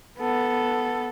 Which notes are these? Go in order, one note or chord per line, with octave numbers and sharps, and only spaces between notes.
B3 A4